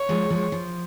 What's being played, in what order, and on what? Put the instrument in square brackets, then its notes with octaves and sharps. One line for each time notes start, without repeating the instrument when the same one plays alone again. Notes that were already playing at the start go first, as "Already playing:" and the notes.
Already playing: [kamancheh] C#5
[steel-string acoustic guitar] F3 G#3
F3 G#3
F3